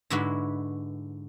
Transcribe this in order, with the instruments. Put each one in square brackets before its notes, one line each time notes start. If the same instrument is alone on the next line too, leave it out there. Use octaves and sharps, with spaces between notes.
[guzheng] G#2 D3 G#3 E4 F#4 B4